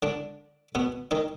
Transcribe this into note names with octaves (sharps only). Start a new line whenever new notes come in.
D3 D4
B2 B3
D#3 D#4